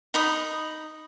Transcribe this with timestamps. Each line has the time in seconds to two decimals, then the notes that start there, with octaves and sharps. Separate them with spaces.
0.14 D#4 B5 D#6